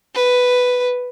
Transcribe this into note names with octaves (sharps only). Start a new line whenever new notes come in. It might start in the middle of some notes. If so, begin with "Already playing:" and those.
B4